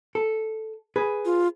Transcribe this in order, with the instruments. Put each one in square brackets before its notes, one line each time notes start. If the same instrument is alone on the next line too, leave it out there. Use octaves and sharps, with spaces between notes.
[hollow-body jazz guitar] A4
G#4 B4
[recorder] F4